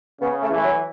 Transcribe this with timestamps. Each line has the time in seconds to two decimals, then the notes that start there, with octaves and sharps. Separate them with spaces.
0.20 C#3 B3
0.42 A3
0.50 E3
0.56 A3
0.64 F#3